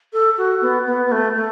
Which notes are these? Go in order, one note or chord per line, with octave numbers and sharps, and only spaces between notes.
A4
F#4
B3
B3
B3
A3
A3